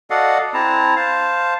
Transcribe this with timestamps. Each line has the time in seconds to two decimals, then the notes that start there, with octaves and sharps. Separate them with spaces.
0.10 F#4 A4 D5 D#5 F5 F#5
0.54 C4 E4 A5 A#5
0.96 C5 F5 A5